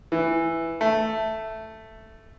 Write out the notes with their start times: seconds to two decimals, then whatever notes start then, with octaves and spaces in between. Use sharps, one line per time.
0.12 E3
0.81 A3